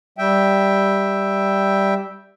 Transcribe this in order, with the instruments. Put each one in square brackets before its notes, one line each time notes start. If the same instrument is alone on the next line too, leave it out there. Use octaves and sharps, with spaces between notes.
[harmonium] G3 E5 G5